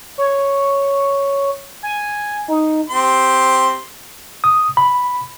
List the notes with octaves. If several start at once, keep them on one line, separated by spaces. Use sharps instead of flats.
C#5
G#5
D#4
C4 G4 C6
D#6
B5